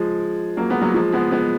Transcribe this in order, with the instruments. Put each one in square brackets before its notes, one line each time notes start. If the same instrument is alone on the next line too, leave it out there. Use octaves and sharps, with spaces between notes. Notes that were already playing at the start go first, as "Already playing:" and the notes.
Already playing: [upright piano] F3 G#3
F#3 A#3
G#3 B3
F#3 A#3
F3 G#3
G#3 B3
G#3 B3